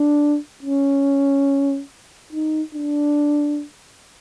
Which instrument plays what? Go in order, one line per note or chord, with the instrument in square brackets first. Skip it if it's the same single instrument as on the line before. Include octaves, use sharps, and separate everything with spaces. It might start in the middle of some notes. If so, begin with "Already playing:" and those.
Already playing: [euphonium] D4
C#4
D#4
D4